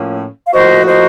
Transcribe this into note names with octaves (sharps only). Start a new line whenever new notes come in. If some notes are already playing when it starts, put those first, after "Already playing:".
Already playing: A2 F3 A#3 C#4
F5
A2 F3 A#3 D#4 F#4 C5 D#5
C5 D#5